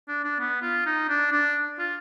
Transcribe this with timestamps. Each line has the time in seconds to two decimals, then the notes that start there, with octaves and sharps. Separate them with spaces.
0.08 D4
0.24 D4
0.40 B3
0.62 F4
0.86 D#4
1.09 D4
1.32 D4
1.79 F4